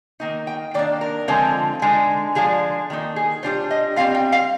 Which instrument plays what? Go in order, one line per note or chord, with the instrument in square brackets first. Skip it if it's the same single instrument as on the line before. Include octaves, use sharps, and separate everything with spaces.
[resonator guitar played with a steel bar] D#3 A#3 D#4
G5
D#3 A#3 D4 D5
A#4
D3 F3 G#3 C4 F4
D3 G#3 D#4
D3 F3 G#3 D4 G#4
D#3 A#3 D#4
G#4
G3 D4 F4 C5
D#5
G3 C4 F4 F5
G5
F5